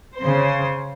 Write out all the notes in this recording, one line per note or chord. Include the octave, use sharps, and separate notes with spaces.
C#3 C5